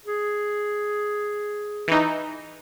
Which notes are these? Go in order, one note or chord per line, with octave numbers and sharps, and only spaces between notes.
G#4
E3 D#4